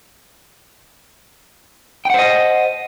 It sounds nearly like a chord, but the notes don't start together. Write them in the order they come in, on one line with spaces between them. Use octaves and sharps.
G5 F#5 C5 D#5